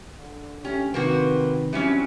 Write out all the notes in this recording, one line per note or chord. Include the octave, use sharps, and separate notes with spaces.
D3
A3 C#4 G4
C3 D#3 A#3 C4 F#4 B4
E3 F#3 G3 C4 C#4 E4